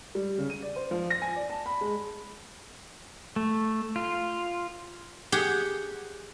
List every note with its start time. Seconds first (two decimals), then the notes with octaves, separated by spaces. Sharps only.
0.15 G3
0.38 C#3
0.50 D#7
0.62 D5
0.76 C5
0.91 F3
1.10 A#6
1.22 G#5
1.36 D5
1.50 A5
1.66 B5
1.81 G#3
3.36 A3
3.96 F4
5.32 G4 G#4 F#5